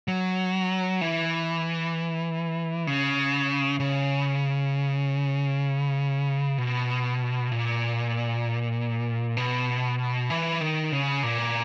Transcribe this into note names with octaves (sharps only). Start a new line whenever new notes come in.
F#3
E3
C#3
C#3
B2
A#2
B2
E3
D#3
C#3
A#2